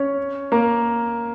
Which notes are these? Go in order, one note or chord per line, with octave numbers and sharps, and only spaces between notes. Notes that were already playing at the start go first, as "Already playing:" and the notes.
Already playing: C#4 C#5
A#3 A#4